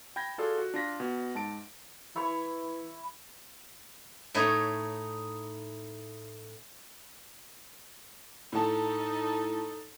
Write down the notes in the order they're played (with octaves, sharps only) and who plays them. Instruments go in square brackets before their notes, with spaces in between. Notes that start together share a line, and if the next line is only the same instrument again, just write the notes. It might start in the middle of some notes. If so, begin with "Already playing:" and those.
[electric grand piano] G5 B5 G6 G#6 A#6
F4 F#4 G#4 A4 D5
F#4
D4 F4 A#6 B6
B2
G#2 A5 D7
[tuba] E3 [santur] E4 C#5
[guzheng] A2 A3 D#4 C#5
[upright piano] A2 A5 [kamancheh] D#4 A4